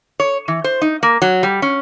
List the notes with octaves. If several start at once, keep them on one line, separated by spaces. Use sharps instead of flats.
C#5
E3
C5
D#4
A#3
F#3
G3
C#4